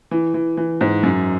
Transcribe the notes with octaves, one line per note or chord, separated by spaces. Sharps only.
E3
E3
E3
G#2
F#2